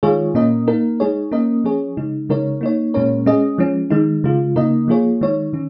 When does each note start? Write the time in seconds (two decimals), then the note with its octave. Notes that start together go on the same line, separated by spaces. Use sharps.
0.03 D#3 G#3 F4 G#4 C#5
0.34 A#2 A#3 C#4 A#4 D#5
0.67 A#3 D#4 A#4
1.00 G#3 D#4 G#4 C#5
1.32 A#3 C#4 A#4 D#5
1.64 F3 C#4 G#4 C#5
1.97 C#3 G#3 D#4
2.29 C#3 G#3 D#4 A#4 C#5
2.61 A#3 D#4 C#5
2.94 A#2 G#3 C#4 A#4 C#5
3.26 G#3 C#4 G#4 D#5
3.58 F3 G#3 C#4
3.90 D#3 G#3 D#4
4.24 C#3 G#3 F4
4.56 C#3 A#3 D#4 A#4 D#5
4.88 F3 A#3 F4 G#4 C#5
5.21 D#3 G#3 D#4 C#5
5.53 D#3 C#4